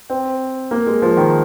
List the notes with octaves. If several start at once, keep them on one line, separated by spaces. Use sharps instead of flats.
C4
A#3
G#3
F3
D#3